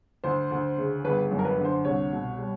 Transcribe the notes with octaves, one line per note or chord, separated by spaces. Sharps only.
D2 C5
D2
C#3
G1 B4
F#2
A#4
B4
D3
C5
C2 C#5
B2
G3